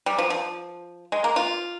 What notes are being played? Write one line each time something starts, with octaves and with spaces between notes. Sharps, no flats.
G3
F3
F3
G#3
A#3
F4